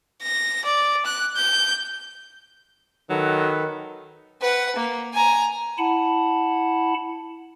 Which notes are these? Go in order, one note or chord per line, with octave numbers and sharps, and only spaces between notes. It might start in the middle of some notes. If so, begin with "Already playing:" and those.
A#6
D5
F#6
G6
D#3 F#3 A4 B4
B4 F#5
A#3
G#5 A#5
E4 F#5 A5 B5